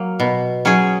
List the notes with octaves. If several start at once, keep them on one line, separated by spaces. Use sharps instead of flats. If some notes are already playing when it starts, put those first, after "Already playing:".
Already playing: F#3 A#3
B2
F#3 C#4 G#4